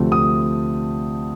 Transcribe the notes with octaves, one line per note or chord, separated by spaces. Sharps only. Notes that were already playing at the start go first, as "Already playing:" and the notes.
Already playing: D2 C3 F3 A3 C4
D#6